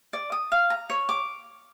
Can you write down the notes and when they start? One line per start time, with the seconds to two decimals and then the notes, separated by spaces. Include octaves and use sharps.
0.13 D5
0.32 D#6
0.52 F5
0.70 A#5
0.90 C#5
1.09 D6